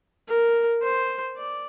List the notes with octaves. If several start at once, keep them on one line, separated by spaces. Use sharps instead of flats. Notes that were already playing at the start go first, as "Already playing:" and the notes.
A#4
C5
D5